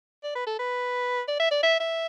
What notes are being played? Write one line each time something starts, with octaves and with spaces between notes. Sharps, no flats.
D5
B4
A4
B4
D5
E5
D5
E5
E5